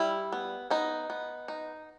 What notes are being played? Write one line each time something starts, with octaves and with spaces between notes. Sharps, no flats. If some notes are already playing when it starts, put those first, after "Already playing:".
Already playing: G3 E4
B3
B3 D#4
B3
D#4